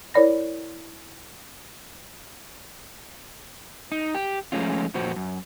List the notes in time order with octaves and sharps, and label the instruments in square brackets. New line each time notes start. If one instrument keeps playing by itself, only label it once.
[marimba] E4 A#4 C#5 D5 B5 A#6
[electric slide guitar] D#4
G4
F3 G#3 A3 C#4 F4
F2 A#2 F#4 C5
F#2